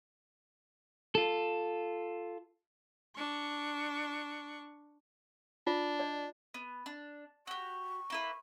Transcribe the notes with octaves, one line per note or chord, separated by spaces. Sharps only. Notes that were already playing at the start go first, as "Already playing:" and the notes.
F4 A4
D4 C#6
D4 F4
D5 D#5
B3
D4
F#4 G4 C#6
A#3 E4 B4